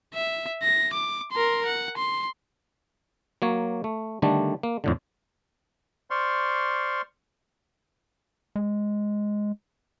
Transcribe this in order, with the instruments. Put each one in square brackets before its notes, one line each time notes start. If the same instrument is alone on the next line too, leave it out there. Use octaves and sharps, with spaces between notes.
[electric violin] E5
A#6
D6
A#4 C6
F#5
C6
[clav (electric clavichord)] F#3 A#3 C#5
A3
D3 D#3 G3 A3 D4
A#3
F2 A2 D3
[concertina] C5 D5 C6 C#6 F6
[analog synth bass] G#3